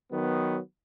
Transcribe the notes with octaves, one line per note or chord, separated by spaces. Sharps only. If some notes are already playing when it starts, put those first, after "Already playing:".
D#3 F#3 B3